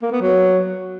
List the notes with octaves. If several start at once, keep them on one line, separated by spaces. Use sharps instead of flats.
A#3
B3
F#3